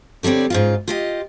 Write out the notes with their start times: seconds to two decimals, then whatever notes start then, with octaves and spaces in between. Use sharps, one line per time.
0.23 D3 G3 C4 C#5 D5
0.50 G#2 C#3 F4
0.88 F4 G4 D#5